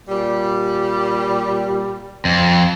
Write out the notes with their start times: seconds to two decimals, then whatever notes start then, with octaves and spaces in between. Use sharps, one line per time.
0.09 A#2 G3
2.25 F2